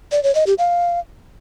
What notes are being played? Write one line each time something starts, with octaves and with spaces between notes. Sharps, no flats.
D5
C#5
D#5
G4
F5